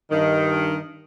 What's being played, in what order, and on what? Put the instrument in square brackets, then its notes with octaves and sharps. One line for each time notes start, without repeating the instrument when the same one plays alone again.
[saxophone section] G2 D#3